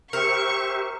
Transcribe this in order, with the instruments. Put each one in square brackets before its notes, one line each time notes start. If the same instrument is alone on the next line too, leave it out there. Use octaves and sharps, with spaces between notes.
[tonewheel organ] G4 C5 E5 [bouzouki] A#4 [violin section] C#6